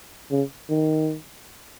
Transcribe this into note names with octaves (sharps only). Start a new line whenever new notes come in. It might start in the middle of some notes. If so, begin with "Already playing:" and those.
C#3
D#3